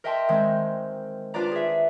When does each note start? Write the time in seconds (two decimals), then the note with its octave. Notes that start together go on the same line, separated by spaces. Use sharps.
0.04 A#4 D#5 E5 G5 A5 C6
0.29 D#3 G#3 C4
1.34 D4 F4 B4 D5 A#5
1.51 G#4 E5